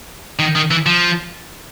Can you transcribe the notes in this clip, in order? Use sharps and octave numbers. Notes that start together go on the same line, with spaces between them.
D#3
D#3
E3
F3